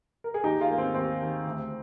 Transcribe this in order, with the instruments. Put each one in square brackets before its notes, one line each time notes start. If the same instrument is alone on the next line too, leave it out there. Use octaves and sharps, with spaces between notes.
[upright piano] A#4
G#4
D#2 D#4 G4
F4 G#4
D#3 A#3
C4
D#2 C4
D#3
D2